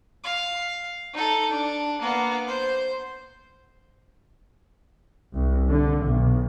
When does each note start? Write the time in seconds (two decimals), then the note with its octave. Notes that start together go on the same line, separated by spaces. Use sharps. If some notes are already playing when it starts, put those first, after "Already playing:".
0.24 F5
1.13 D#4 A4
1.51 D4
2.01 A#3 B3
2.47 C5
5.34 C2
5.67 D3
6.04 B1